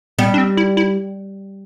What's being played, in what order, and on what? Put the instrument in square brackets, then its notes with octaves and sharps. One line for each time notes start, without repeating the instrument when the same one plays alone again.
[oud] G3 [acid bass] B3
[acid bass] D4
C4
E4
E4